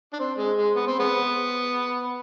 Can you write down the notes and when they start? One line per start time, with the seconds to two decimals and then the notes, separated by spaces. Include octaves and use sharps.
0.13 D4
0.19 C4
0.38 G#3
0.57 G#3
0.75 B3
0.87 C4
0.99 G#3 B3